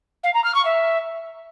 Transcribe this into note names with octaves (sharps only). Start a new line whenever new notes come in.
F5
A#5
F6
C#6
E5